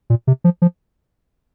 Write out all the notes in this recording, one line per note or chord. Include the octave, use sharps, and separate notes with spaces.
A#2
C3
F3
F3